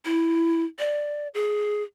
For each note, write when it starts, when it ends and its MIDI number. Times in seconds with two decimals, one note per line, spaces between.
0.05 0.63 64
0.79 1.28 74
1.34 1.83 68